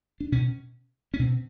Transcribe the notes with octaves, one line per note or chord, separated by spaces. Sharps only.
D4
B2 C#4
C#4
B2 C4